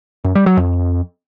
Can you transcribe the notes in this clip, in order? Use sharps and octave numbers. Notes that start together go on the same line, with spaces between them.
F#2
G3
F#3
F2